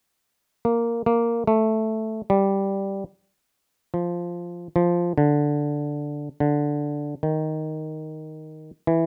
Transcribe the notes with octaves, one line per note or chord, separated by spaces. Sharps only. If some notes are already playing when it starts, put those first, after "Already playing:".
A#3
A#3
A3
G3
F3
F3
D3
D3
D#3
E3